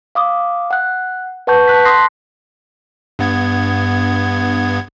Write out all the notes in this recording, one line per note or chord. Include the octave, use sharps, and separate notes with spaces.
F5 D6 D#6
F#5 F#6
B4 F#5 A5 C#6 G6
A5 F#6 B6
C6 D#6 F#6 A#6 C7
G2 B3 G#6